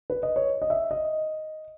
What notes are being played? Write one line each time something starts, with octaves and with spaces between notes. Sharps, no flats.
B4
D#5
C#5
D#5
E5
D#5